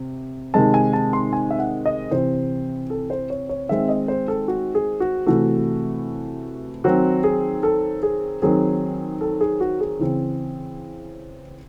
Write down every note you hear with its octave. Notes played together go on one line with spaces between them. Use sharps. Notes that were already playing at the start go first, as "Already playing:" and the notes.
Already playing: C3
C3 D#3 G#3 C4 A5
G#5
A5
C6
G#5
E5
F#5
D#5
C3 E3 C4 C5
A4
C5
C#5
C#5
D#3 G#3 C4 E5
D#5
C5
A4
F#4
G#4
F#4
C3 E3 A3 F#4
D#3 F#3 C4 F#4
G#4
A4
G#4
D#3 F#3 C4 G#4
A4
G#4
F#4
G#4
C#3 E3 C4